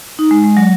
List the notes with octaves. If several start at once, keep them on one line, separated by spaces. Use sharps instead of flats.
D#4
G#3
G#3
F#3